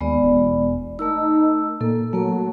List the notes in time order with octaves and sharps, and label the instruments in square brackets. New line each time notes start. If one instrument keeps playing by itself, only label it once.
[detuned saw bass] D#2 [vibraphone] G#3 B3 D5
[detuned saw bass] E1
[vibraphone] A3 A#4 E6 [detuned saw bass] D#4
[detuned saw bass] A#2 [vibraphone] A#3 A4
[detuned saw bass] F#3 [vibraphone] A3 A#3 A#4